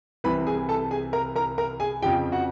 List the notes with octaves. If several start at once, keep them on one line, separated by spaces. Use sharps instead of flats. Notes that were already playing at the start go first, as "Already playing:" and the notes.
C2 C3 E3 B4 B5
G#4 G#5
A4 A5
G#4 G#5
A#4 A#5
A#4 A#5
A#4 A#5
G#4 G#5
F2 C#3 F3 G4 G5
F#4 F#5